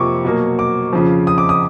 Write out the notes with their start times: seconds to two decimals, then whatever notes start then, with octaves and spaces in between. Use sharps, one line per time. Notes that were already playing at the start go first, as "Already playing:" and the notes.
Already playing: F2 C3 F3 A#3 C#6 D6
0.25 B2 F#3 A#3
0.59 D6
0.93 F2 C#3 F3
1.27 D#6
1.38 D6
1.49 D#6